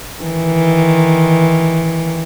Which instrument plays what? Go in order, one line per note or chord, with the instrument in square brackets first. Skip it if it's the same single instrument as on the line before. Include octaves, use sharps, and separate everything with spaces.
[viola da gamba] D#3 E3